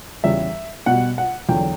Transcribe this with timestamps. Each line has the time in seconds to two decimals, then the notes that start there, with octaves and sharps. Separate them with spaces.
0.24 E2 C#3 G3 E5
0.86 B2 G3 F#5
1.18 F#5
1.49 E2 D3 F#3 G5